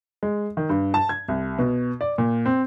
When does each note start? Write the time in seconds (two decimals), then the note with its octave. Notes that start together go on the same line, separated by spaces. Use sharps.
0.23 G#3
0.57 D#3
0.69 G2
0.94 A5
1.09 G#6
1.28 C2
1.59 B2
2.01 D5
2.18 A#2
2.45 C4